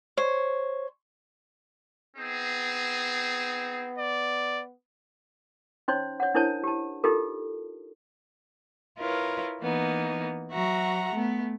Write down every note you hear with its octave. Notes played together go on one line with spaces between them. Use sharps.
C5 C#5
B3 C4 D#4 G#4
D5
C#4 D#4 C5 C#5 C6
C#5 F#5
D4 E4 A#4 C5 C#5 A5
G4 A5
D#4 F4 G4 A4 A#4
E4 F4 A#4 B4 C#5
E3 A#3 B3 D#4
F#3 F#4 E5 F#5 A#5
A3 B3